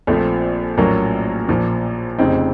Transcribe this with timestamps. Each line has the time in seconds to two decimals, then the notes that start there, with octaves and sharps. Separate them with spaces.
0.07 A#1 A#2 F3 A3 C4
0.78 A#1 A2 F#3 A#3 C#4
1.48 A#1 A#2 F3
2.18 F1 F2 C#3 C4 D#4